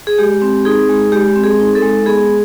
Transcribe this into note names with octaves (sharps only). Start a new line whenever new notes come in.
G#4
G#3 G4
C4
D#4 G#4
G#3
G#3 G4
C4
G#4
D#4
A4
G#3
B3 G#4